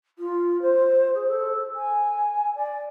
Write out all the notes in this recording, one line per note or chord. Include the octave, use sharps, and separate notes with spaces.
F4
C5
G#4
A4
G#5
D5